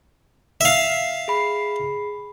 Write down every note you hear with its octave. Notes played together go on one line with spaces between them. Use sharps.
E5 F5
G#4 B5 C7